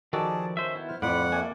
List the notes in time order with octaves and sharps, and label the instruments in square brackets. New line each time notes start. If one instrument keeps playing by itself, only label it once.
[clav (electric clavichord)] D#3 F#4 A4 [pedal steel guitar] F3 D5 [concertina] G#4 A5
[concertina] C#4 [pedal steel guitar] C5 E5
[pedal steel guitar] B3 E4
[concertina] C5 F6
[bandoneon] F2 F#5 [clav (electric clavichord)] A2 [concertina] F4 B4 B5 [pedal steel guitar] D5
[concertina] A3 D5 [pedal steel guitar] A#3 [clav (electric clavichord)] G#5